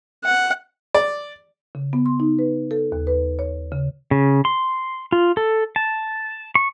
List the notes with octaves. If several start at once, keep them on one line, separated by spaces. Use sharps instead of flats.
F#5
D5
C#3
B3
C6
D#4
B4
A4
D#2
B4
C#5
C#3
C#3
C6
F4
A4
A5
C#6